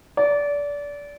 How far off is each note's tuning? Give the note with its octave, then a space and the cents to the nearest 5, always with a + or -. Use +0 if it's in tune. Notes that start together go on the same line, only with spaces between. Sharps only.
D5 -25